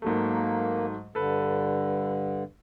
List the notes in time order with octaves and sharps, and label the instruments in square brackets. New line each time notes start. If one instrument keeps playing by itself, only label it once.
[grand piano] G#2 F#3 A3 [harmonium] A#3
[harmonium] G2 D3 [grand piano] A4 B4